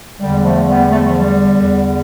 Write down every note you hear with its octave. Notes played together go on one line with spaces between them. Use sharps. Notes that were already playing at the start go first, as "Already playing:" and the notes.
E2 D3 G3
G3
F3 A3
G3 B3
A3
G3
F3
G3
E2 D3